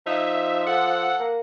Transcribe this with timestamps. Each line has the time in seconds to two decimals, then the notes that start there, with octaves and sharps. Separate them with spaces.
0.06 F3 D#4 E5
0.66 A4 F#5
1.20 A#3